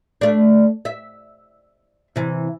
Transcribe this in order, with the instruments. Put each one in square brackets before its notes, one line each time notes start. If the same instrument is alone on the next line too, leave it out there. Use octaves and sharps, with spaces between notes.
[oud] A3 D4
E5
C3 E3